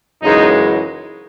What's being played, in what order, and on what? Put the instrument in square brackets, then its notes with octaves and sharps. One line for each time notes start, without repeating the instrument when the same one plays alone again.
[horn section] F#2 C#3 E3 G#3 D#4